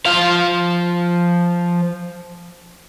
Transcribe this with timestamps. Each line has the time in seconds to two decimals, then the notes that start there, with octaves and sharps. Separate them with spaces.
0.06 F3 F5